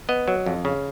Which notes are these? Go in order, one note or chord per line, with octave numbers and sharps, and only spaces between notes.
B3 D#5
F#3
F2
C#3